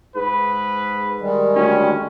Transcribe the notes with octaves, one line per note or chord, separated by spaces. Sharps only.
G#2 B4
D#3 G3 G#3
D2 C#4